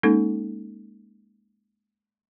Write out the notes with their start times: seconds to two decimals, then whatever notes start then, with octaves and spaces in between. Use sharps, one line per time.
0.03 G#3 A#3 C#4 D#4 A4